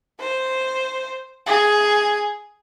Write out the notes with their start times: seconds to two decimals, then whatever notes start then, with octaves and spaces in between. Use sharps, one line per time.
0.20 C5
1.47 G#4